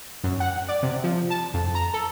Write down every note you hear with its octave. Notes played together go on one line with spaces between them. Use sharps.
F#2
F#5
D5
C3
F3
A5
F2
A#5
A4